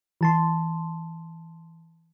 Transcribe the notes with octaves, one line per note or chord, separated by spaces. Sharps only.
E3 A5 C6